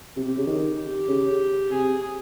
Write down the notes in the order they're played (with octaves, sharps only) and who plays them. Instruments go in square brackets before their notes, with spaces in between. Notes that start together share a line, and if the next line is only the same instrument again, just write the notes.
[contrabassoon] C3 [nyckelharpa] G4
[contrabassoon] C3
C#3
D#3
[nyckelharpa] G4
[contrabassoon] C#3
[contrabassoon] C3 [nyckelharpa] G#4